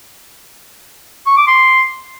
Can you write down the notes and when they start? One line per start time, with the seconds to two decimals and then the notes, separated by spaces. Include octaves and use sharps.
1.26 C#6
1.37 D6
1.47 C6